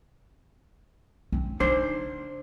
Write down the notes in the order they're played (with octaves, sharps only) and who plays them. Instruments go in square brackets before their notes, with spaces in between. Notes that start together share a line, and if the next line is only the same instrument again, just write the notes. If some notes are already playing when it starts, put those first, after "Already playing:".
[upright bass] C4 C#4
[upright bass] C#3 D#4 [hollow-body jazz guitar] D4 C5